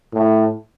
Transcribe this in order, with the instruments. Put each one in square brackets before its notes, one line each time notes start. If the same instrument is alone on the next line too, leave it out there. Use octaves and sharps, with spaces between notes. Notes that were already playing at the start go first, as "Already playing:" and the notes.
[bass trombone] A2